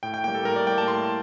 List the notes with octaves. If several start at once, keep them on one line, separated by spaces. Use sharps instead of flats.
A2 G5
G5
G3 A#3 G5
A4
A2 A#4
D5
G3 A#3 G5
A5
A2 C6